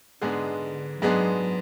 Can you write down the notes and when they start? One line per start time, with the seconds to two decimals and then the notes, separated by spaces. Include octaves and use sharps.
0.22 G#2 D3 G#3 B3 D4 G#4
1.02 G#2 F#3 G#3 B3 D4 G#4